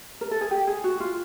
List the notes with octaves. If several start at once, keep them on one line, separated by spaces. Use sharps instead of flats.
A#4
A4
G#4
G4
G#4
F#4
F4